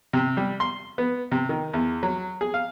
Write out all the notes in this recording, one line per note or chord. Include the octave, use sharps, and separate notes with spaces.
C3
G3
C6
B3
C3
D#3
E2
F#3
G#4
F5